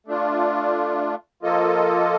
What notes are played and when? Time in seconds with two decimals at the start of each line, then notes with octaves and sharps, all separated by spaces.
0.07 A3 D4 F4
1.43 F3 A#3 F4 A4 D#5